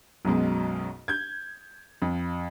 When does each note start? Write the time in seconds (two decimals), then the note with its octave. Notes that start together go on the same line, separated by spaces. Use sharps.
0.25 B1 F#2 B2 G#3
1.08 G6 G#6
2.02 F2